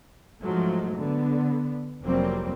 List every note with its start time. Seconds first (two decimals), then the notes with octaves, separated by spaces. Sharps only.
0.41 G#2 F3 F#3 G#3 A3
0.95 D3 B3
2.02 F1 F#3 G3 A#3 C4